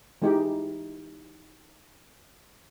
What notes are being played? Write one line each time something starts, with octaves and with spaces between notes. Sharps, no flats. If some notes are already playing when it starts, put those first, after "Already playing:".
E3 G#3 D#4 G4